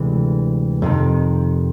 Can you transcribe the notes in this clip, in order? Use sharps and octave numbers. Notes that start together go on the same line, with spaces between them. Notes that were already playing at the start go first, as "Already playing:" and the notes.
Already playing: D2 C3 E3 G#3
F2 C3 D#3